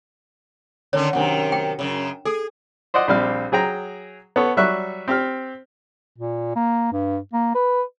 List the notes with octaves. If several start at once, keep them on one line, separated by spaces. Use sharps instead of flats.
D3 D#3 C#4 C#5
F#2 C3 D#3 D4 F#5
G5
F#2 A#2 C#3
G#4 A4
C5 D5 D#5 F#5
A#1 G3 C4 F5
F#3 G#4 G5 A#5
B3 A4 C#5
F#3 G3 E5 C#6 F#6
C4 G4 F6
A#2
A#3
G2
A#3
B4